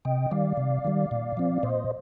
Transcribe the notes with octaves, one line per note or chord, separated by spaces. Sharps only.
C3 D#5 G5
D#3 G3 D5 F5
C3
D#3 G3
A#2
F3 C4
A#2 C5 D#5